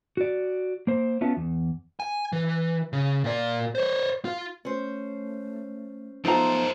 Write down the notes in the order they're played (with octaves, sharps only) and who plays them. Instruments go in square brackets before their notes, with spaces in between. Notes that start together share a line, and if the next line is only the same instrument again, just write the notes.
[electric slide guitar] F#4 D5
A#3 C5
B3 C#4 F4 E5 A5
E2
[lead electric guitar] G#5
E3
C#3
A#2 D5
C5 C#5
F4
[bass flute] A3 [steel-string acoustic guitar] C#4 C5
[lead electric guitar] F#2 C5 [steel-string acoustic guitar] F3 A3 F4 [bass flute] B3 [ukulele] D#4 A#5